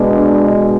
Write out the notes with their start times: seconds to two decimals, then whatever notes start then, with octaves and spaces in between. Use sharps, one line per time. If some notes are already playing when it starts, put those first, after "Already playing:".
Already playing: B2 G#3 B3 D4